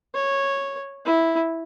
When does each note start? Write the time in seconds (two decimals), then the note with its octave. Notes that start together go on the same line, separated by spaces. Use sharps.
0.14 C#5
1.05 E4